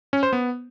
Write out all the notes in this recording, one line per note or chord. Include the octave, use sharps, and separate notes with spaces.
C#4
C5
B3